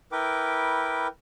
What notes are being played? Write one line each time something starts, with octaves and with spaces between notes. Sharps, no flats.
E4 A#4 B4 G5 D6